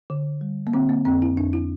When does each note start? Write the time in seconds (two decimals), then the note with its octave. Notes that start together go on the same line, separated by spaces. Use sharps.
0.10 D3
0.41 G3
0.67 A#3
0.74 D3 C4
0.89 A#3
1.05 F2 C4
1.22 E4
1.37 F2 D4
1.53 E4